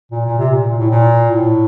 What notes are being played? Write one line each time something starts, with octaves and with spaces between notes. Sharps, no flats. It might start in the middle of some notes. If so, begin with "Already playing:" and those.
A#2
A#2
C3
A#2
A#2
A2
A#2
A2